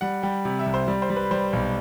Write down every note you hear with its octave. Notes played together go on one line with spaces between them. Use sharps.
G3 F#5
G3 G5
C3
E5
C2
C5
G3
C5
G3
B4
G3 C5
B1